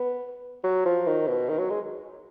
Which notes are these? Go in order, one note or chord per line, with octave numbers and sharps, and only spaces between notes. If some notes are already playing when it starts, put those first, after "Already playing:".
Already playing: B3
F#3
F3
D#3
B2
D#3
F#3
G#3